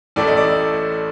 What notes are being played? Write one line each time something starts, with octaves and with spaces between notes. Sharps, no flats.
A1 A2 A3 D5
D#5
D5